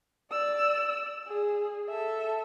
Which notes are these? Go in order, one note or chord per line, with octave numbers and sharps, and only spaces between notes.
D5 E6
G#4
A4 E5